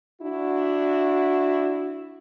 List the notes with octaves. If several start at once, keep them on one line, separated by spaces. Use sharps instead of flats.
D4 E4 F#4